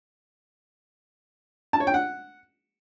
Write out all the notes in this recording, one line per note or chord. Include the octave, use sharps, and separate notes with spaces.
A5
C#5
G5
F#5